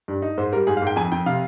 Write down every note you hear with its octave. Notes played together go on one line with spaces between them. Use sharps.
G2
D#4
G#2 C5
G3 A#4
G#2 G#4
F5
G#2 G5
F2 G#5
F2 G5
C3 F5